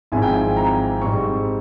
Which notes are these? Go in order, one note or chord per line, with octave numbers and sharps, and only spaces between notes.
G#1 G#2 F3 C4 E4 G#5
G5
G#5
A#5
G#2 G3 C4 C#6